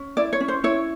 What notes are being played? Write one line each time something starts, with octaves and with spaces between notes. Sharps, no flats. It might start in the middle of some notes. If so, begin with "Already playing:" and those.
Already playing: C#4
E4 D5
C#5
C#4
C5
E4 C#5